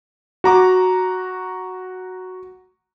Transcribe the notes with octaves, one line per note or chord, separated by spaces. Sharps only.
F#4 A#5 D6